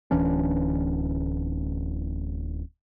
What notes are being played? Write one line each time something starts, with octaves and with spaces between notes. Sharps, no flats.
D1 E3 C#4 D4